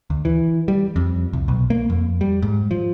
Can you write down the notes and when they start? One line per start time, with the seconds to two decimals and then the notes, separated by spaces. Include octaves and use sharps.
0.10 D2
0.25 E3
0.68 G3
0.96 F2
1.33 C2
1.48 B1
1.70 A#3
1.90 F2
2.21 G3
2.42 G#2
2.71 F3